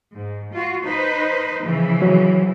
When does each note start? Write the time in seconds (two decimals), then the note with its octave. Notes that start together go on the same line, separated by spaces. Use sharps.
0.12 G#2
0.52 F4 F#4
0.86 D#4 B4 C5
1.64 C#3 E3 F3
2.02 F#3